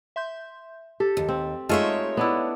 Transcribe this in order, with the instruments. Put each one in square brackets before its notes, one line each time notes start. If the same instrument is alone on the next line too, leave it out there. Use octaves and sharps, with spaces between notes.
[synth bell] E5 C6 G6
[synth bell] G4 [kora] A4
[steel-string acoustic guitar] D#2
[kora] C4
[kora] G#3 A3 F4 [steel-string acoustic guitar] D#4 C#5 E5
[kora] B3 D4 E4